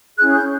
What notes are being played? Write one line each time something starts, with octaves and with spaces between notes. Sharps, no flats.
C#4 E4 G#4 F#6
G6